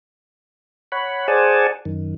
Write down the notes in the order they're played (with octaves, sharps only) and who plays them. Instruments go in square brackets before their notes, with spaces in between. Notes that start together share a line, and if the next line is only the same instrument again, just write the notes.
[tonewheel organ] C#5 F#5 B5
G#4 C5 D5 F#5 G#5 A5
F#2 D#3